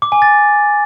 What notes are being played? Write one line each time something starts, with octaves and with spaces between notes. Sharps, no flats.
D6
G#5
A6